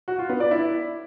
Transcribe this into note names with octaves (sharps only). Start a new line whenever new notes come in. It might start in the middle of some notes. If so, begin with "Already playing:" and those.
F#4
F4
B3
D5
E4